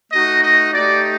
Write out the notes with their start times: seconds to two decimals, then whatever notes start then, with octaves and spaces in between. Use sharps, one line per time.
0.11 A3 D#4 F#4 D#5
0.42 D#5
0.74 A3 D#4 G4 D5